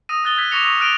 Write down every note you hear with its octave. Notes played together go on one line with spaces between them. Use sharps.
D#6 E6 A#6 D#7
D#6 F#6 A6 G7
E6 F#6 G#6 B6
C#6 D6 A#6 C#7 F7
C#6 E6 A#6
F6 F#6 A#6 D7 D#7 F7